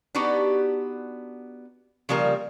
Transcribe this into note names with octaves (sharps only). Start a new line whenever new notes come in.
B3 D4 D#4 F#4 G4
C#3 F3 G3 A#3 A#4